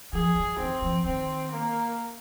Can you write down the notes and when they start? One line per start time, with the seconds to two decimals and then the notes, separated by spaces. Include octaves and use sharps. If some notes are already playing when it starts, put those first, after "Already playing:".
0.13 F3 G#4
0.36 G3
0.59 D#3 C4
0.82 F3
1.04 D#3 C4
1.51 A#3